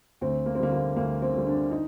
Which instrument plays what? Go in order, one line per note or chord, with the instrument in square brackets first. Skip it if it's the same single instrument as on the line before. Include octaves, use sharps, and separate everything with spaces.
[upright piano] D2 C4
A#3
C4
D3 G3 A#3
A#3
D2 A#3
C4
D3 G3
D4
D#4